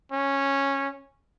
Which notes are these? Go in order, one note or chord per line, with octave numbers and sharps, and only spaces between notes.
C#4